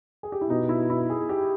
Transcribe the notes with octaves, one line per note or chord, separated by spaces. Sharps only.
G#4
G4
E4
B2 D#4
E4
E4
G#4
G4